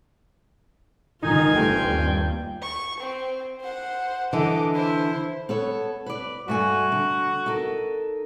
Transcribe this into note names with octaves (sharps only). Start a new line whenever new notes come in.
G#2 D#3 D#4 F4 G#5
G1 G2 A3 C4 G5
D#2
C#6
C4
C5 F#5
D3 E3 D#5 D6
E4 C5
B3 A4 C#5
B4 D5
G2 A3 F#4 G#5
D3
D#4 A4 A#4